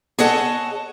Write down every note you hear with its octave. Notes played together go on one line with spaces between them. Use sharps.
G#4 A4 C#5 D#5 F#5 A5